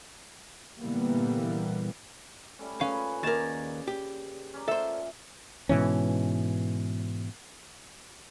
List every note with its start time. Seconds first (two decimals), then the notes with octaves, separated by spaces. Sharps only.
0.80 A#2 D3 E3 G3 A#3 B3
2.59 G3 A3 C#4
2.81 A#2 C#4 G#4 B4 F5
3.23 D#2 C#3 A#4 D5 G#6 A6 E7
3.88 G4
4.54 C#4 D5 A#5
4.68 A#2 A4 C5 E5
5.69 G#2 B2 E3 C#4